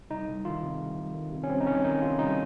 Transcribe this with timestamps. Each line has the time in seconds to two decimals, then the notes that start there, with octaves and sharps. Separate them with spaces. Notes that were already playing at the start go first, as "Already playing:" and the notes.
0.10 C2 D#4
0.28 C2
0.45 D#3 F4
0.62 C3
0.80 C2
0.97 C2
1.14 D#3
1.32 C3
1.43 C#4
1.49 C2 C4
1.60 D#4
1.67 C2 C#4
1.84 D#3 D#4
2.01 C3 F4
2.19 C2 D#4